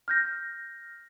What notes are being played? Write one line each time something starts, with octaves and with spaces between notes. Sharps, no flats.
F6 G6 A#6